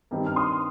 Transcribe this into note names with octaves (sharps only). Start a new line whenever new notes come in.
G2 D#3 G3 C4
F6
C6 D#6